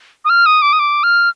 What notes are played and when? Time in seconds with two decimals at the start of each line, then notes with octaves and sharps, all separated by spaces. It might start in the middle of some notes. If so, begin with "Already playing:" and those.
0.25 D#6
0.30 F6
0.46 D#6
0.62 D6
0.73 D#6
0.79 D6
1.03 F6